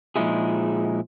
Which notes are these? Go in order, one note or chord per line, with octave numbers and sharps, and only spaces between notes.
A#2 F3 G#3 D#4 E4 G#4